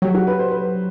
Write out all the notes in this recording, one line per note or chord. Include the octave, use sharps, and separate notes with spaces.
F#3 G4
F#4
B4
C5
B4